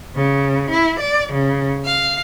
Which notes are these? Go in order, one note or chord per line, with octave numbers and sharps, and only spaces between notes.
C#3
E4
D5
C#3
F5